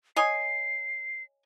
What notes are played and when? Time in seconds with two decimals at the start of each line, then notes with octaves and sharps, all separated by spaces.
0.16 C#5 D#5 G#5 C7